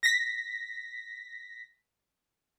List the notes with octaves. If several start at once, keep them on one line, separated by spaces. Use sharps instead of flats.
A#6 B6